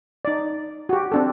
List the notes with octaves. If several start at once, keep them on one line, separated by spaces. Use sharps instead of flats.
D#4 D5
F#4 G4
C4 D4 A4